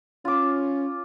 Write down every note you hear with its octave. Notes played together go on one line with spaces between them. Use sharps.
C#4 F4 D6